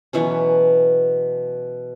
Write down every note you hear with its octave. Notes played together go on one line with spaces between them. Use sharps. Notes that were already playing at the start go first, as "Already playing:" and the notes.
B2 E3 F#3 C#4